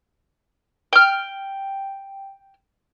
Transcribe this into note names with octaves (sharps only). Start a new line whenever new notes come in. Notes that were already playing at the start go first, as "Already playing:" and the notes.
G5 F6